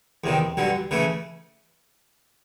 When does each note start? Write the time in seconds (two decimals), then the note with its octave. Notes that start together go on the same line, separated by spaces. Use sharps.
0.24 E2 C3 D#3
0.57 G2 D3 F#3
0.91 C#3 E3 A3